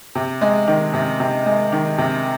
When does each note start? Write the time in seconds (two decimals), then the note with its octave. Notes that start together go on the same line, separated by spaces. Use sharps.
0.15 C3
0.41 G#3
0.67 D#3
0.94 C3
1.20 C3
1.46 G#3
1.72 D#3
1.98 C3